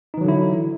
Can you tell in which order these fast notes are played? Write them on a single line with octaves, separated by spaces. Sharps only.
D#4 E3 F#3 D3 E4